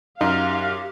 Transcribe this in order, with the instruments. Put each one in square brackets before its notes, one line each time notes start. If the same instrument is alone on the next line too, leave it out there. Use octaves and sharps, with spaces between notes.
[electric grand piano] F#2 [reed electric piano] D#4 [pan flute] G4 [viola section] F5